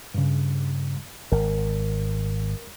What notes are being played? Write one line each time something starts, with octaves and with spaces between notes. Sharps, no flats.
G2 C#3
G#1 A#4